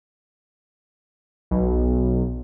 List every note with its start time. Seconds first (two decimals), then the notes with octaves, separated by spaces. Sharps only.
1.51 B1